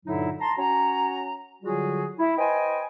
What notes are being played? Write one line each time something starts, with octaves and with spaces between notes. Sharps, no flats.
G2 A#2 D3 F#3 D#4 E4
A5 A#5 C6
C#4 F#4 C#5 A#5
D3 F#3 G3 F4 F#4 G#4
E4
B4 C5 D#5 G5 G#5